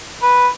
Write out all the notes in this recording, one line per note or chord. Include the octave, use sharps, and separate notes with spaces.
B4